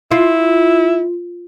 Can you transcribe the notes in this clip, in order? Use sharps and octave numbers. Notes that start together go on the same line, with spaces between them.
E4 F4